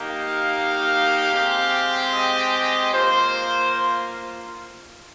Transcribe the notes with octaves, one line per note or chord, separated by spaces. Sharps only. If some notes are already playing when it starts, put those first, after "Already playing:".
Already playing: A#3 D#4 G4
F5
G#3 C4 G4
D#5
A#3 F4 C5